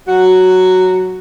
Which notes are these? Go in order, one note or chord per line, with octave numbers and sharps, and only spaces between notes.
F#3 F#4